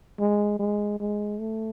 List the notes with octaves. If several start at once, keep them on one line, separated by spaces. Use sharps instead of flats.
G#3
G#3
G#3
A3